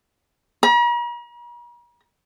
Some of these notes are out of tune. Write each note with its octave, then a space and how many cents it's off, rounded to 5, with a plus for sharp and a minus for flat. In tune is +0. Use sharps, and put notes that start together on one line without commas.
A#5 +45